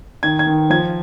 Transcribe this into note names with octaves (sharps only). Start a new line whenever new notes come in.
D#3 G#6
G#6
D#3
F3 G#6